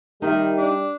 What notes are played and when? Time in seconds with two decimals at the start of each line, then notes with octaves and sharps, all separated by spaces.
0.22 D#3 G3 D#4 G4 D#5 E5
0.57 D4